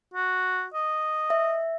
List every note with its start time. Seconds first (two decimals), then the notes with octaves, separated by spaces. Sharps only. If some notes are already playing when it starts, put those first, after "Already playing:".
0.14 F#4
0.74 D#5
1.30 E5